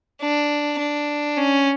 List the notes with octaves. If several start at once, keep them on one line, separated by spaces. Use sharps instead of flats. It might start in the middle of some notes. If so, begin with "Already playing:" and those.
D4
D4
C#4